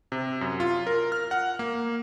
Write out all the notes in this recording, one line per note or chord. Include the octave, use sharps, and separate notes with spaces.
C3
F#2
F4
A#4
F6
F#5
A#3